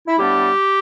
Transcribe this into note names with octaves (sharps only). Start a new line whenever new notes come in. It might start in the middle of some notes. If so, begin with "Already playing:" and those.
E4
A2 G3 B3 D4 G4